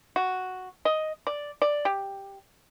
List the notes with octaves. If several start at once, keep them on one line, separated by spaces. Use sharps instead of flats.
F#4
D#5
D5
D5
G4